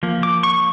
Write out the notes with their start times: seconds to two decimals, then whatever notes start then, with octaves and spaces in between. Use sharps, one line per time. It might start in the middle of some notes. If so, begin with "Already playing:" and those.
0.03 F3 A#3
0.23 D6
0.43 C#6